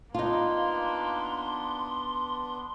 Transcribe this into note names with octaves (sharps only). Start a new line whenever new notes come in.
A#3 B3 D4 D#4 F4 C6